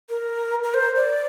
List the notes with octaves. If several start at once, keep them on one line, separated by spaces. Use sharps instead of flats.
A#4
A#4
C5
D5